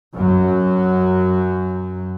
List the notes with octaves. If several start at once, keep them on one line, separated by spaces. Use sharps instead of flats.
F#2 F#3